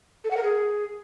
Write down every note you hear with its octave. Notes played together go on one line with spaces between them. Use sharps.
A4
F#5
A#4
G#4